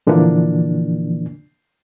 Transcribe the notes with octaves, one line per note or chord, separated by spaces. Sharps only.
A#2 D3 E3 F3 A#3 D4